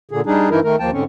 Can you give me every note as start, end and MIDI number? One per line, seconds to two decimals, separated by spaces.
0.11 0.21 46
0.11 0.21 50
0.11 0.21 68
0.26 0.49 55
0.26 0.49 62
0.26 0.49 63
0.26 0.49 68
0.50 0.60 43
0.50 0.60 52
0.50 0.60 63
0.50 0.60 64
0.50 0.60 70
0.64 0.76 51
0.64 0.76 57
0.64 0.76 70
0.79 0.91 39
0.79 0.91 53
0.79 0.91 58
0.79 0.91 79
0.79 0.91 81
0.93 1.04 44
0.93 1.04 50
0.93 1.04 60
0.93 1.04 61